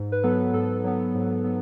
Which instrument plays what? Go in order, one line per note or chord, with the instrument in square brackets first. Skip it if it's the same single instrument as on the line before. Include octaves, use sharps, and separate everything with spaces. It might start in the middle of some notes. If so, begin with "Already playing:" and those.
Already playing: [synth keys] G#2
B4
F#3 B3 A4
G#2 A4
F#3 B3
G#2
F#3 B3